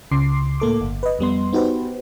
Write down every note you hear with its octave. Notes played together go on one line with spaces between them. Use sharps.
C#2 C#3 C6 D6 C7
A2 A#3 A4 D6
G1
B4 D#5
F2 G3 B3 C6
B3 D#4 F#4 G4 B4 C5